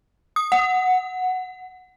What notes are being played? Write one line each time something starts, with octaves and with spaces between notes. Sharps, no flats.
D#6
F#5